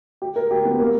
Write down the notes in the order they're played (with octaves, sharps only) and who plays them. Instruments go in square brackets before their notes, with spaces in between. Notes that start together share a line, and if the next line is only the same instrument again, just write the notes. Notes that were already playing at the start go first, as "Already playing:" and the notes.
[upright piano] G4
A#4
G4
B3
A#3